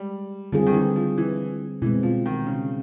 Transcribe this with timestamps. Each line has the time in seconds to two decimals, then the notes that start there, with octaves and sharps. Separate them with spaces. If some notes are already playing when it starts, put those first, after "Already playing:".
Already playing: G3 G#3
0.52 D3 F3 G3 C4 D#4 G#4
0.66 D#3
0.74 E3
0.96 F3
1.18 E3
1.82 B2 E3 G#3 C4
2.03 F3
2.26 D#3
2.46 C#3